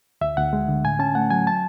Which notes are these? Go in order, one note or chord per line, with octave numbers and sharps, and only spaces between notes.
D2 E5
D2 F#5
G#3
D3
A2 G#5
C#4 A5
A3 F#5
F#3 G#5
A5